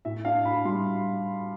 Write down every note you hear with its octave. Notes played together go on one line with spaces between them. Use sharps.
A2 E5
D4 F5
A2 B5
G3 C6